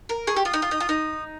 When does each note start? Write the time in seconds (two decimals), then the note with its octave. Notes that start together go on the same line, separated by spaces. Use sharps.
0.09 A#4
0.27 G#4 C#6
0.36 G4
0.45 F4 D#6
0.53 D#4
0.62 F4
0.71 D#4
0.80 F4
0.89 D#4